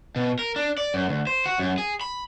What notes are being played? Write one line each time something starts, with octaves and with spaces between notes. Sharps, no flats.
B2
A#4
D4
D5
F#2
D2
C5
F#4
F#2
G#4
B5